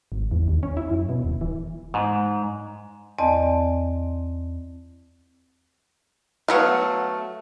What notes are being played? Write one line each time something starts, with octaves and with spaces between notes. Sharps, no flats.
G#1
E2
D#2
C#4
E4
F#2
B2
D#1
E3
G#2
E2 C4 D5 D#5 A5
F#3 A3 B3 F5